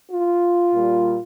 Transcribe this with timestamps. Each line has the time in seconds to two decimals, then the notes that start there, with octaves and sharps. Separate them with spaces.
0.10 F4
0.72 A#2 G3